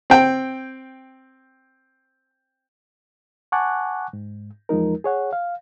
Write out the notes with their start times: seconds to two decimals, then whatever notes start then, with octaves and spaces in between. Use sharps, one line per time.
0.10 C4 G5
3.52 F#5 G#5 A5 C#6 D6 F#6
4.13 G#2
4.69 E2 F3 G#3 D#4 A#4
5.04 G#4 C#5 F#5
5.33 F5